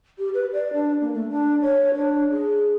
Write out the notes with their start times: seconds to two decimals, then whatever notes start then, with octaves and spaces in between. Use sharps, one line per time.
0.18 G4
0.34 B4
0.53 D5
0.73 D4
1.01 A#3
1.13 A3
1.30 D4
1.62 C#5
1.95 D4
2.31 G#4